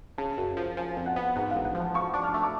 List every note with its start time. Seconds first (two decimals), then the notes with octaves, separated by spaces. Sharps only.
0.18 C#3 A5
0.38 F#2
0.57 F3
0.77 F3 G#5
0.97 F2
1.06 F#5
1.16 B3
1.36 G#2 F#5
1.51 A1 F5
1.65 F#5
1.75 F3
1.80 A5
1.94 F3 C#6
2.13 D4 D6
2.23 F6
2.34 A3
2.43 D6